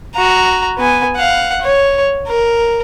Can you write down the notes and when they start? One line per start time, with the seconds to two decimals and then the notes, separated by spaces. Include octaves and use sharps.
0.14 F#4 A#5
0.78 B3 G#5
1.15 F5 F#5
1.61 C#5
2.27 A#4